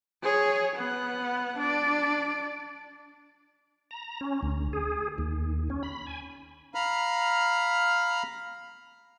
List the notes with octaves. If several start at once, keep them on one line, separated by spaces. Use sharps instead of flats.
G#4 C#5
B3 F#5
D4 D5
A#5
C#4
D2
G#4
D#2
C#4
B5
G#5
F5 A#5 B5 F6